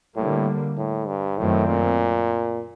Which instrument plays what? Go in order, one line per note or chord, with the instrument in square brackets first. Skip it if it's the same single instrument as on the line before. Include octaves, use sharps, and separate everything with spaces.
[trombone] A2 [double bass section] D3 G3 A#3
[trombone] A2
G2
[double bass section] F#2 D#3 F#3 A3 C4 [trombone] A2
[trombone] A#2